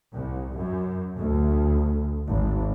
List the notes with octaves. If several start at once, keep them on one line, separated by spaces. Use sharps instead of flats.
C2
F#2
D2
G#1